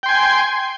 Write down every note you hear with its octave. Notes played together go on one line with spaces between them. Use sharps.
G5 G#5 C6